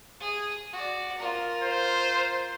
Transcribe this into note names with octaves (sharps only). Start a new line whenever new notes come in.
G#4
F#4 D5
F4 A#4
C5